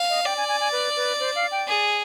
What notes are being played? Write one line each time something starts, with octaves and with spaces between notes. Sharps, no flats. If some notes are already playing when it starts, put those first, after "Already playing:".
Already playing: F5
D#5
D5 G5
G#5
G#5
G#5
B4
B4
C5
F5
G5
G#4